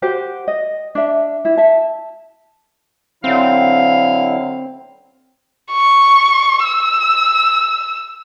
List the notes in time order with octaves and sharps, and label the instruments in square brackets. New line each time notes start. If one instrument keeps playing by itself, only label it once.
[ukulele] F#4 G4 C5
D#5
D4 E5
E4
E5 A5
[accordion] D3 F#3 E4 [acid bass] C4 [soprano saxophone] F5
[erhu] C#6
E6